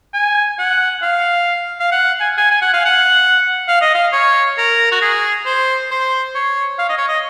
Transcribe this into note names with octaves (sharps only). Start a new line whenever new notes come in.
G#5
F#5
F5
F5
F#5
G#5
G#5
G#5
F#5
F5
F#5
F5
D#5
F5
C#5
A#4
F#4
G#4
C5
C5
C#5
F5
D#5
C#5
D#5